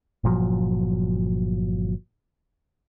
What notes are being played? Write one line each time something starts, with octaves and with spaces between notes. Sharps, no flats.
G1 A#2 F3 F#3